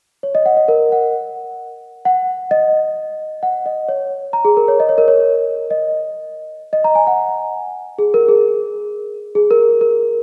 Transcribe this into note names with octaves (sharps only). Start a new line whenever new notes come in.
C#5
D#5
F#5
D#5
A#4
F#5
F#5
D#5
F#5
D#5
C#5
A#5
G#4
A#4
C#5
D#5
C#5
A#4
C#5
D#5
D#5
A#5
G#5
F#5
G#4
A#4
G#4
G#4
A#4
A#4